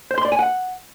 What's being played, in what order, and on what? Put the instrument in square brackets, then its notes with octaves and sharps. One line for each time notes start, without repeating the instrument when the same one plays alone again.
[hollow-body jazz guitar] C5
C6
D5
G#5
F#5